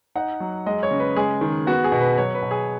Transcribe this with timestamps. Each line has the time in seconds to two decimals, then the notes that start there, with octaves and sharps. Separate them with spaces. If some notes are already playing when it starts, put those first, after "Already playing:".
0.15 D#4 F#5
0.40 F#3
0.66 G#3 D#5
0.83 C#5
0.91 C#3
0.99 B4
1.16 G#3 G#4
1.41 D#3
1.67 B3 F#4
1.84 G#4
1.92 B2
2.00 B4
2.18 F#3 C#5
2.34 B4
2.42 B2
2.51 G#4